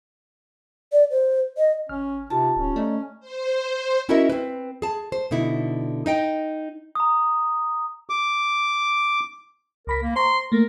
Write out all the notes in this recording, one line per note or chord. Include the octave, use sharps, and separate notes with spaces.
D5
C5
D#5
G#1 C#4 F6
C3 D#4 F4 G4 A5
D1 C#4
A3 D5 D#5 A#5
C5
C#4 E4 F#4 A#4 D#5 E5
C4 B4
G#4 A5
C5
B2 D3 D#4 E4
D#4 D#5 G5
A#5 D#6
D6
C#2 A#4 B5 B6
A#3
C5 A#5 C6 C#6
A3 A#3 A#4